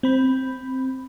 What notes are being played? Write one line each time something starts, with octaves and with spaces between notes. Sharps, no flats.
C4 B5